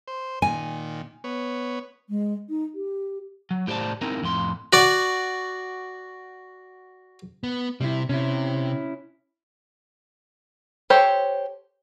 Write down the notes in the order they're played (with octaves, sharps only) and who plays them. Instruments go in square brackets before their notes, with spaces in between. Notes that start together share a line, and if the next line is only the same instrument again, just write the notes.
[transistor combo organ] C5
[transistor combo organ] A#2 D#3 [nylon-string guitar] G#5
[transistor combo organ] B3 C#5
[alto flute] G#3
D#4
G4
[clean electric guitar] F#3
A2 G4 C5 D5 A5
C4 D#4 E4 A#4
F2 A2 C6
[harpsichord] F#4 D5
[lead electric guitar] B3
[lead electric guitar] C3 [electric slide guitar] G3 E4
[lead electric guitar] C3 [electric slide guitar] C#4 E4
[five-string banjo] G4 A4 C5 C#5